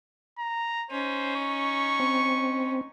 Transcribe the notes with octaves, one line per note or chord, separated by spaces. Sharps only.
A#5
C#4 D#4 C5
C#6
C4